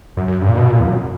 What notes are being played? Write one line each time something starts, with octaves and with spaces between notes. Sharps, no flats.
F#2
F#2
G2
A#2
B2
A#2
E2
F#2